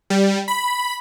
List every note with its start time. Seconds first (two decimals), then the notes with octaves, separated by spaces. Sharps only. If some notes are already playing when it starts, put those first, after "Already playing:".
0.10 G3
0.48 B5